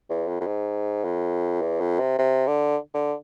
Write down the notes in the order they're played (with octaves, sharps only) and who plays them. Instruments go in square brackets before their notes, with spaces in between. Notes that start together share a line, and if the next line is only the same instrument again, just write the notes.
[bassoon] E2
F2
F2
G#2
F2
E2
F2
C3
C3
D3
D3